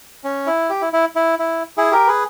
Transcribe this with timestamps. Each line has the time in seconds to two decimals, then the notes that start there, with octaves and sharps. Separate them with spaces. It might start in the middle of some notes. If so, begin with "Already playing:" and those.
0.24 C#4
0.47 E4
0.70 G4
0.82 E4
0.93 E4
1.16 E4
1.39 E4
1.77 E4 G#4
1.92 G4 A#4
2.07 G#4 B4